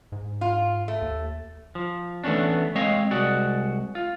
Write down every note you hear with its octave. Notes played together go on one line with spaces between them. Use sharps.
G#2
F4
A3
D#2
F3
E3 A3 B3 C#4 D4
G#3 C4 C#5 D#5 F5
C2 G#3 F#4 D5
F4